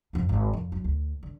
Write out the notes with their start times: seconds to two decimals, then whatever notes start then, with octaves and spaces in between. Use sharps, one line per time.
0.13 F2 D#4
0.29 G#1
0.53 F2
0.72 F#3
0.84 D2
1.23 D3